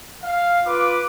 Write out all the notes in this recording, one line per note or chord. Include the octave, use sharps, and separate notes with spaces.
F5
F4 B4 D6